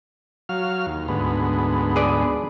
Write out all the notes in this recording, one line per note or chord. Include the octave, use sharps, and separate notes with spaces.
F#3 F5 F6
D#2
D2 G#2 B3
G#4 B4 D5